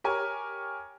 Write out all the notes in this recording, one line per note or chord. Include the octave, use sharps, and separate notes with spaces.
G4 A#4 C#5 G#5